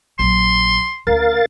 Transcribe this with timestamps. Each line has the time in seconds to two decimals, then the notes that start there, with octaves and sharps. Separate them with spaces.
0.19 A#1 F#3 C6
1.07 D2 C#3 A#4 F5 A6